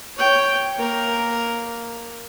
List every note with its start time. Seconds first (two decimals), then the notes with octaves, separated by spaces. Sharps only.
0.18 C#5 G5
0.78 A#3 A#4